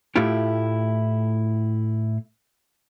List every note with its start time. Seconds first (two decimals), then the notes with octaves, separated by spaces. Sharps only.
0.16 A2 A3 E4 F4 G4